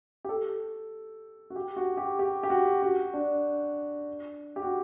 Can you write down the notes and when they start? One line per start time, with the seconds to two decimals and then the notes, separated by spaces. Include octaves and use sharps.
0.25 G4
0.29 A4
1.50 F#4
1.56 G4
1.77 F#4
1.97 G4
2.19 G4
2.43 G4
2.50 F#4
2.82 F#4
3.14 D4
4.56 G4
4.63 F#4